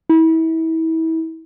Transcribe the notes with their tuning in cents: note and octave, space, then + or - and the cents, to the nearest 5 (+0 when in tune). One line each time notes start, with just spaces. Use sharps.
E4 -30